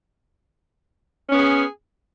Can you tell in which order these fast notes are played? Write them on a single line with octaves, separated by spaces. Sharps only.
C#4 B3 G#4